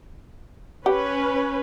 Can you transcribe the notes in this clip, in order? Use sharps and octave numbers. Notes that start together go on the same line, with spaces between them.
C#4 G4 B4 F#5